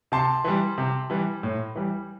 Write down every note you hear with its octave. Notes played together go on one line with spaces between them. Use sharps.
C3 A5 C6
E3 G3
C3
E3 G3
A2
E3 G3